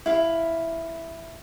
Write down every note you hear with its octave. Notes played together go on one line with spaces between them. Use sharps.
E4 F5